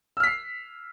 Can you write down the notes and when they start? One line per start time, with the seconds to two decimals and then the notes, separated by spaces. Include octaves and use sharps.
0.17 E6
0.20 F6
0.23 B6
0.27 C7